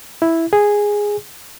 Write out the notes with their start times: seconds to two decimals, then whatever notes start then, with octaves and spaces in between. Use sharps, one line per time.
0.22 E4
0.53 G#4